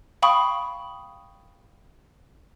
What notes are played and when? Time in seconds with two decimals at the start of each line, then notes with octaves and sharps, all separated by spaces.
0.22 F5 G5 B5 C#6 D#6